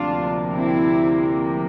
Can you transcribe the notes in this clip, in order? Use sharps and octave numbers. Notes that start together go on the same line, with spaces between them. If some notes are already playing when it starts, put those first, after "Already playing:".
Already playing: D2 C3 F3 A#3 D4 F4
C4 E4